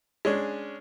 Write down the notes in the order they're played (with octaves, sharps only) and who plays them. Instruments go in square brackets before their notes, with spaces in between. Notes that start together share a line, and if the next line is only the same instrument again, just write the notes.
[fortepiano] G#3 C#4 D4